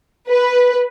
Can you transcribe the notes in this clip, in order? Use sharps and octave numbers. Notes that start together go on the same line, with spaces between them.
B4